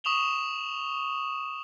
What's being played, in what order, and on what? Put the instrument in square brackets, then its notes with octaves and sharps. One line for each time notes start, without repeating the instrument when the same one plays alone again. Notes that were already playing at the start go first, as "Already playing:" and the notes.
[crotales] C#6 D#6 E7 F7 G7